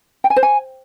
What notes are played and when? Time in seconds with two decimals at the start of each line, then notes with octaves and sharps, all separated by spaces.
0.24 G5
0.30 G#5
0.36 C5
0.43 G#5